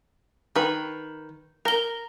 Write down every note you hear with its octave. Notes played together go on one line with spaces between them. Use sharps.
D#3 B4
A#4 A#5 G7